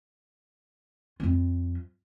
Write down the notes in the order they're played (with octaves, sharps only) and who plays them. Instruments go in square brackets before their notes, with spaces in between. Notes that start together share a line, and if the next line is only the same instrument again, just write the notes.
[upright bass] F2 F4